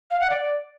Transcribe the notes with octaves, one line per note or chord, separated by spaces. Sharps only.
F5
F#5
D5